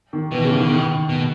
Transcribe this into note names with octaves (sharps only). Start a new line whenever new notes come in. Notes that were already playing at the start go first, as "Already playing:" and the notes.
D#3
B2 E3
C#3
D#3
D#3
B2